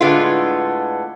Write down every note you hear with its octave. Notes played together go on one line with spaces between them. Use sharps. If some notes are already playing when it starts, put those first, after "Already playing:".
A2 D3 G#3 B3 F4